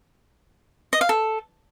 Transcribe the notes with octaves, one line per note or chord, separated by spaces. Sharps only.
D#5
F5
A4